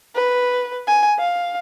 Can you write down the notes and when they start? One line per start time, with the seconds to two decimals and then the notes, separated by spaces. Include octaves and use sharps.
0.15 B4
0.87 G#5
1.19 F5